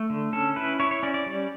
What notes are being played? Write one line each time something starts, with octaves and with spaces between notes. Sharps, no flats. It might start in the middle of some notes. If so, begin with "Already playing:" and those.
Already playing: A3
D3
C#4 A4
E4 B4
E4 C#5
C#5
C#4 D5
D5
G3